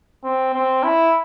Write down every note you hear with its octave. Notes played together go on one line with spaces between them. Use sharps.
C4
C4
E4